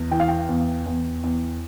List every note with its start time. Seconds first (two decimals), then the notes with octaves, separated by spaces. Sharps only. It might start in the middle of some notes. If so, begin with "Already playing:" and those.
Already playing: E2
0.11 E3 G5
0.20 F5
0.28 G5
0.49 E2
0.86 E2
1.24 E2